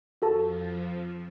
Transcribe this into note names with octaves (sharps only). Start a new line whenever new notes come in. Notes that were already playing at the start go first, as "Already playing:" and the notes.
F2 F3 F#4 A4 A5